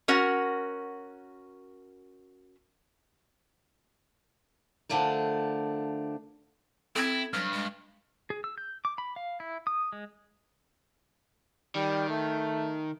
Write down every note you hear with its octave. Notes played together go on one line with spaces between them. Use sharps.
C#4 F#4 A#4 F#5
D3 F3 A3 D4 A#4
C4 E4 A4 G#6
G2 F#3 F6
G#3
G#4
E6
G6
D6
B5
F5
E4
D#6
G#3
D#3 G3
A3